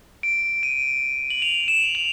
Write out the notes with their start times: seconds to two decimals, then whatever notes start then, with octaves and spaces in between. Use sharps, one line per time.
0.23 D7
0.63 D#7
1.30 F#7
1.42 F7
1.68 E7
1.95 F7